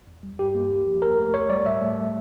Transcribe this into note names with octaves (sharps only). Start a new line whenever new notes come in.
E2
G3
G2 G4
A#3
D2
F3
F2 A#4
A3
D2 C#5
G3 D5
A2 E5
A3